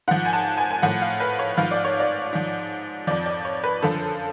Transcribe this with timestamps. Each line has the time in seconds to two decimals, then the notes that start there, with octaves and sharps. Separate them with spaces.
0.08 G#2 F3 F#5
0.25 G#5
0.33 A5
0.58 G#5
0.71 G#5
0.82 A2 F3 F#5
1.01 F5
1.20 B4
1.39 C#5
1.57 G#2 F3 F5
1.71 D5
1.85 C#5
2.00 D5
2.33 G#2 F3
3.07 F2 F3 D5
3.26 D5
3.45 C#5
3.64 B4
3.82 F#2 D3 F3 A4